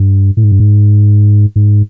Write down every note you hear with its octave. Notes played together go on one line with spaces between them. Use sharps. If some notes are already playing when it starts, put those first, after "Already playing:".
Already playing: G2
A2
G#2
G2
G#2
G#2